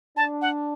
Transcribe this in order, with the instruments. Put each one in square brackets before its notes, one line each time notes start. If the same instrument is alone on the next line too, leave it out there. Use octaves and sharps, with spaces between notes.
[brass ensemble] D4 [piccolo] A5
[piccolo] F#5